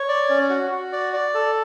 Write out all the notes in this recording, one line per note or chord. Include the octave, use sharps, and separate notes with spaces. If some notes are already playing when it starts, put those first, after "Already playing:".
Already playing: C#5
D5
C#4
F#4
F#4
D5
D5
A4